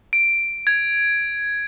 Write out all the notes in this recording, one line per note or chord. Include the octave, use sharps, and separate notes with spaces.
D7
G#6